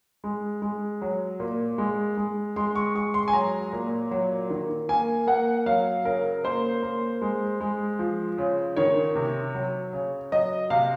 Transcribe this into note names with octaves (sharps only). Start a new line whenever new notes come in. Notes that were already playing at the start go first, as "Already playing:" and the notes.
G#3
G#3
F#3
A#2
G#3
G#3
G#3 C6
C#6
G#3 C#6
C6
G#5
F#3 A#5
A#2
F#3
D#3
A#3 G#5
A#3 F#5
F#3 F5
C#3 A#4
A#3 C5
A#3
G#3
G#3
F3
C#3
D#3 C#5
C3
F#3
C#3
F#3 D#5
C3 F5